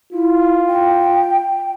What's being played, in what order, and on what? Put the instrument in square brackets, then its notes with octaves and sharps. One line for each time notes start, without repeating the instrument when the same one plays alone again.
[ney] E4 [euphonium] F4
[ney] G5